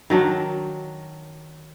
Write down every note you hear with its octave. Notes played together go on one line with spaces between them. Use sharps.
D#3 F#3 D4